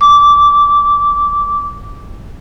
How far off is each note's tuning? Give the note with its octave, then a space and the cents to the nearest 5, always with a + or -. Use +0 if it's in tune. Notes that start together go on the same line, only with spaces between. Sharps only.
D6 -15